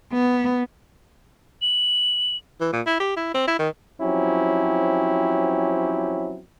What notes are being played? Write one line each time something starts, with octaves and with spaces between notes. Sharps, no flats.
B3
F#7
E3
A#2
E4
G4
E4
C4
E4
D#3
F3 F#3 C4 C#4 E4 G4